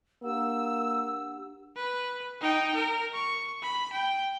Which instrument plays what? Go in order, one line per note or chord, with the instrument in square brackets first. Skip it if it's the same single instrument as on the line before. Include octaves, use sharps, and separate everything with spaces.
[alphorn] A#3 [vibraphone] D4 G4 F#5 [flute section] E6
[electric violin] B4
D#4 G5
A#4
C#6
B5
G5